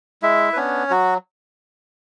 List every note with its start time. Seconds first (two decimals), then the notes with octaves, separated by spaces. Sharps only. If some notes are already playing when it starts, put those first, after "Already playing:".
0.22 G#3 E4 E5
0.53 B4
0.56 B3 C#4 D4 C#5
0.90 F#3 F#4